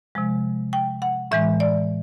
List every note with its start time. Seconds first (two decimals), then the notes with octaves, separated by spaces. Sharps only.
0.15 C3 F3 G#3
0.73 G5
1.02 F#5
1.31 A2 E3 G#3 E5
1.60 D5